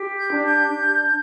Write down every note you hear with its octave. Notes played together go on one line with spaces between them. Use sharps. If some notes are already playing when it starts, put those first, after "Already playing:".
Already playing: G4
G6
D4
G6
D4